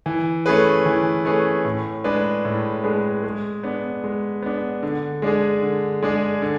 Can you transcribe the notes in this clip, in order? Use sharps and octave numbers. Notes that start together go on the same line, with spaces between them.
E3
A3 C#4 G#4 B4
E3
A3 C#4 G#4 B4
A2
G#3 D4 G#4 B4
A2
G#3 D4 G#4 B4
G#3
B3 D4
G#3
B3 D4
D3
G#3 D4 G#4
D3
G#3 D4 G#4
D3